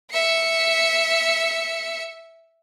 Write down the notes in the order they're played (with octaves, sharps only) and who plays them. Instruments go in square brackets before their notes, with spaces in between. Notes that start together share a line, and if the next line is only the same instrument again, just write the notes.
[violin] E5 C#7